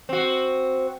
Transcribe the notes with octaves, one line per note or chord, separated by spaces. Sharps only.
C4 F#4